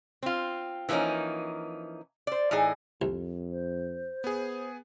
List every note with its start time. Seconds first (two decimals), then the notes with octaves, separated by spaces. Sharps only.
0.23 C4 F4
0.89 E3 F3 A#3 C#4 D#4
2.27 C5 D5
2.51 A2 E3 D#4 G#4
3.02 C2 F2
3.51 C5
4.24 B3 G#4